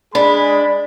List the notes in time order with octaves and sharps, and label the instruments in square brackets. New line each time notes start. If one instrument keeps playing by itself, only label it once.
[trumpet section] G#3 G#4 B5 [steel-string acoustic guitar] D4